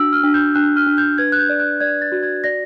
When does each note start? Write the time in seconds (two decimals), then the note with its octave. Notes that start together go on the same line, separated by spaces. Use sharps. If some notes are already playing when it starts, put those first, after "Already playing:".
Already playing: D4 F#4 E6
0.13 F6
0.24 D4
0.34 G6
0.55 D4 F#6
0.76 F6
0.87 D4
0.98 G6
1.18 B4 G#6
1.32 F#6
1.39 G6
1.49 D5
1.60 F#6
1.80 D5 G#6
2.02 A6
2.12 F#4
2.23 G#6
2.44 D5 A#6